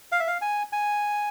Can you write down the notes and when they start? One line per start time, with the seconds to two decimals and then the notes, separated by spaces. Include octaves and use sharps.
0.12 F5
0.20 E5
0.27 F5
0.41 G#5
0.72 G#5